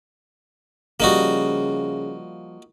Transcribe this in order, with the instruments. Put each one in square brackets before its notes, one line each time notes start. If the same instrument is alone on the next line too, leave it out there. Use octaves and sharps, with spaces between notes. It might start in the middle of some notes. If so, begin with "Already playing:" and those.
[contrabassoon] C#3 [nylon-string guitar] F3 G3 [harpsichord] A#3 D#4 F#4